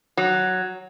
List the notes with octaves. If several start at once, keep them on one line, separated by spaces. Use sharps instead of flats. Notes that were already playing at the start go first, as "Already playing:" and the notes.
F#3